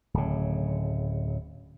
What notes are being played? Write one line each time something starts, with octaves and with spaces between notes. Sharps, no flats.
D1 C#3